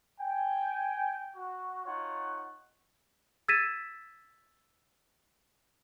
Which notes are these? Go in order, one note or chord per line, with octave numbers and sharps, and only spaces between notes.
G5 G#5
F#4
D#4 F4 C#5 F#5
E6 G#6 A6 B6 D#7 E7